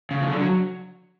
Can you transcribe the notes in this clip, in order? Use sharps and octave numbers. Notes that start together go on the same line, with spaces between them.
C#3
F3
D3
F#3